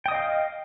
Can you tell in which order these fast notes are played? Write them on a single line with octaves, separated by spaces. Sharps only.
G5 D#6 D#5 F5